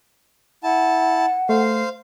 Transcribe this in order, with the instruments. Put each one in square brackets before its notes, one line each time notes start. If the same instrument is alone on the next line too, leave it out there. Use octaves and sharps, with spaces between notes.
[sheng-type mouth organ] E4 A5 [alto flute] F#5
[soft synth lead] A3 [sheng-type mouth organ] C5 F5